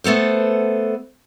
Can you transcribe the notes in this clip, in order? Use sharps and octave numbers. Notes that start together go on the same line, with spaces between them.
A3 B3 A4 C5